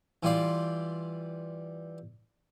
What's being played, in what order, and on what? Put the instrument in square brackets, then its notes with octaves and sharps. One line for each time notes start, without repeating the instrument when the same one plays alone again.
[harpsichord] E3 G3 F4 G4 D5 C6